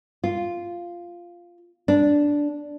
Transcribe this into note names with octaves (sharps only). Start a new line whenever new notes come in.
F4
D4